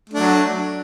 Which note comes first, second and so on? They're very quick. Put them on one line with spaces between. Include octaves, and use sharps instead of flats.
A3 D4 F#3